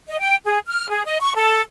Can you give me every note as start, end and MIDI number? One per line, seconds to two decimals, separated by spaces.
0.08 0.19 75
0.20 0.35 79
0.45 0.58 68
0.66 0.87 89
0.89 1.04 68
1.05 1.18 75
1.20 1.33 85
1.35 1.61 69